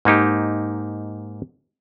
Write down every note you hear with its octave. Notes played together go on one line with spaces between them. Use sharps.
G#2 A#3 D#4 G4